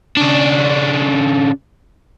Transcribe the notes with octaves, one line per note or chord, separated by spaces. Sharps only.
C#3 D4